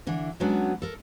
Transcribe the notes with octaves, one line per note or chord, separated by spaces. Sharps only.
D3 E3 D4
F#3 G#3 B3 C#4 D4 F#4
A4 A#4